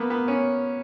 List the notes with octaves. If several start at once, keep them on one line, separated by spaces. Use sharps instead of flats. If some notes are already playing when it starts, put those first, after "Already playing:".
Already playing: A#3 B3
B3
C#4